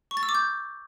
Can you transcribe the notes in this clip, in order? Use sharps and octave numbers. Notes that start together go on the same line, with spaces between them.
C#6
A6
E6
D6
G6